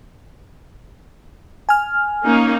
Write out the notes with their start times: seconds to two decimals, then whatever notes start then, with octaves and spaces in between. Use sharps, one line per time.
1.69 G#5 F6
2.24 A#3 C#4 D#4